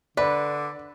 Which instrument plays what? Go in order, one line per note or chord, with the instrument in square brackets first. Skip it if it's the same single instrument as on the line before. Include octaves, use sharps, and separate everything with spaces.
[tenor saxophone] D3 [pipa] B4 [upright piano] D5